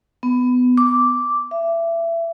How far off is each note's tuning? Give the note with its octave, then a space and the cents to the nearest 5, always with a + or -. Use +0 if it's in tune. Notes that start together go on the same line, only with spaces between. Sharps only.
B3 +15
D6 -5
E5 +25